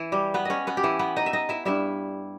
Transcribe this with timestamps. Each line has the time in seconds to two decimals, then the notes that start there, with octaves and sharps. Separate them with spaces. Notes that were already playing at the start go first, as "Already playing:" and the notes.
Already playing: E3 E4
0.12 G3 G4
0.34 B3 B4
0.45 C#4 C#5 D#5
0.67 B3 B4
0.77 G4
0.84 E3 E4
0.99 B3 B4
1.16 D#4 D#5
1.26 E5
1.33 D#4 D#5
1.49 E4 E5
1.65 G2 G3 E4 E5